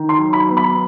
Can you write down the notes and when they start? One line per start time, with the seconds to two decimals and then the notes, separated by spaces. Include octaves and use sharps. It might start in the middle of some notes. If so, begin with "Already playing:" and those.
Already playing: D#3
0.09 C6
0.18 F#3
0.33 B5
0.49 B3
0.57 B5